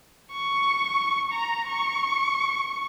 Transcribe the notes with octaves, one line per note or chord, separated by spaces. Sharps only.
C#6
A#5
C#6